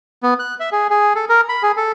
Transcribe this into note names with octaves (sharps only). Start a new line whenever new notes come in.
B3
F#6
E5
G#4
G#4
A4
A#4
B5
G#4
A4